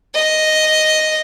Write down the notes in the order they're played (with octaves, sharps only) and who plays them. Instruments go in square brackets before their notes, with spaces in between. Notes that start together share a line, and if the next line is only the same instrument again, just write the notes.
[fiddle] D#5